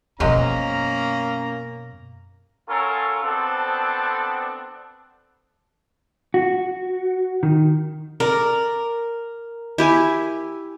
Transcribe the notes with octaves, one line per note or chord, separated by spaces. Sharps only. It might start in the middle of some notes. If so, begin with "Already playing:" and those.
F#2 B2 F3 F#3 G#3 A#3 C#4 A#5
F#3 C#4 F4 A4 A#4
B3 C4 D4 A4
F#4
D#3
A#4 D5
E4 G4 G#5